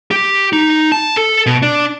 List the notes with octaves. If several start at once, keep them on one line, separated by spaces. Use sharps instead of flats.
G4
D#4
A5
A4
B2
D4